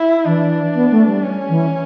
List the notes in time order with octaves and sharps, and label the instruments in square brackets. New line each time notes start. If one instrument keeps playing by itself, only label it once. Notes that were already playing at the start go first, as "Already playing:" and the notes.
Already playing: [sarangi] E4
[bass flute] E3 [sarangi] D4
[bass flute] B3
A3
G3
[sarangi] C#4
[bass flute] E3